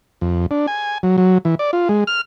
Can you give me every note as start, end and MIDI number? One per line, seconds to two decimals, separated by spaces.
0.21 0.46 41
0.51 0.66 62
0.67 0.98 80
1.03 1.17 54
1.18 1.38 54
1.45 1.55 52
1.59 1.71 74
1.73 1.88 65
1.89 2.04 56
2.07 2.21 89